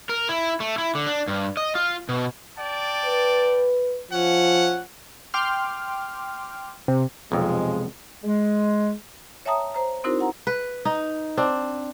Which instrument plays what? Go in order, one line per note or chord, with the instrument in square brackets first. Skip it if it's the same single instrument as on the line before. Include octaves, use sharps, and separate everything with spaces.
[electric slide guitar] A#4
E4
A3
E4
D3
D4
G2
D#5
F4
B2
[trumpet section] D5 G5 A5
[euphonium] B4
[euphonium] F3 [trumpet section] C#4 F#5
[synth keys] G5 C6 D6 F6
C3
[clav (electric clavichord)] B1 F2 [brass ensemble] C3 F3 G#3
[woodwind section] G#3
[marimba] C#5 E5 G5 A5 A#5 D#6
C5 A#5
C4 D#4 E4 F#4 A#4 C5
F#4 F#5 A#5
[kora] B4
D#4
C4 D4